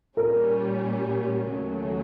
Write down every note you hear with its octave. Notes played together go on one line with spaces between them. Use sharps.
A#2 G3 A#3 C#4 A#4
D#2 C#3 F#3 A3 C#4